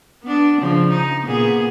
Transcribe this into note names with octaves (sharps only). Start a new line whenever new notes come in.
B3 D4
C#3 F3
D#4
A#2 B3 G#4